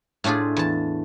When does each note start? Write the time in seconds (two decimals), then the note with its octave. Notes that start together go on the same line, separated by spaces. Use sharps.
0.24 A2 A3 D4 F4 G#4
0.56 E2 A5